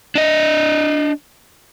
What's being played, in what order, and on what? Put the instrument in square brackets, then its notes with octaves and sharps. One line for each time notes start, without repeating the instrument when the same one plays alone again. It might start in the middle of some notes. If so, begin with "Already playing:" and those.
[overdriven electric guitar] D4 D#5